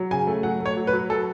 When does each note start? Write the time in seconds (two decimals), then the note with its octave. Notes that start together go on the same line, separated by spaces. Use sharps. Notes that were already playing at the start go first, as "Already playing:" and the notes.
Already playing: F#3
0.11 C#3 G#5
0.27 A3
0.43 F#3 F#5
0.60 A3
0.66 C#5
0.77 F#3
0.87 B4
0.93 F#3
1.10 F#3 A4